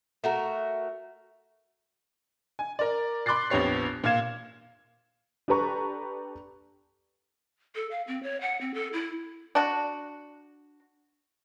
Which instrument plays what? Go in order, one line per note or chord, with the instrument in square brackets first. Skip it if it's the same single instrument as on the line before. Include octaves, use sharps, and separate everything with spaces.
[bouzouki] A3 F#4 A#4
[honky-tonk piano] G#5
A#4 D5
B5 C6 D6 F#6 A6 C7
A#1 F2 B3 G4 C#5 C7
A#2 F4 F5 G#6 E7
D4 G4 A4 B4 A#5 C#6
[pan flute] A4
F5
C4
C#5
F#5
C4
A4
E4
[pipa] D4 F#4